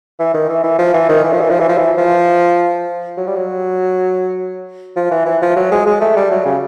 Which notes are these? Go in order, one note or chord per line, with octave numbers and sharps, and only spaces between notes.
E3
D#3
E3
E3
F3
E3
D#3
E3
F3
E3
F3
E3
F3
E3
F3
F#3
G3
F#3
F3
E3
E3
F3
F#3
G#3
G#3
A3
G3
F#3
C#3